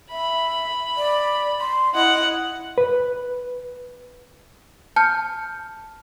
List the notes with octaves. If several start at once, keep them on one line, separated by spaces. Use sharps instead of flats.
E5 B5
D5
C6
E4 D#5 F#5
B4
A5 F6 G6 C#7